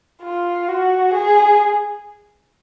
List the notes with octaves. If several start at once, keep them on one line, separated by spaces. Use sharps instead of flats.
F4
F#4
G#4